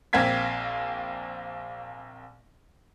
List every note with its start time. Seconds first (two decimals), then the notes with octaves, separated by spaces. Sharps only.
0.13 A#1 A#3 C4 F5 G#6 B6